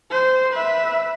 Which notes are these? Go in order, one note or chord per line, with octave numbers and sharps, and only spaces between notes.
C5
B4 E5